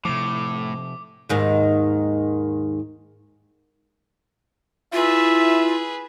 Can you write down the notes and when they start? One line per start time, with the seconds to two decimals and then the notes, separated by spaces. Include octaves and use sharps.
0.05 A2 C3 F3 D6
1.29 D#2 G#2 D#3
4.93 E4 F4 G#4 B4 E5